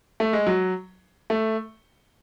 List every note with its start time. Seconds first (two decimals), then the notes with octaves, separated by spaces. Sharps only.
0.20 A3
0.33 G#3
0.47 F#3
1.30 A3